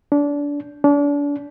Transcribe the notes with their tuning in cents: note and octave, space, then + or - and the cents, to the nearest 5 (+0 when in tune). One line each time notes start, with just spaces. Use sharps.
D4 -25
D4 -35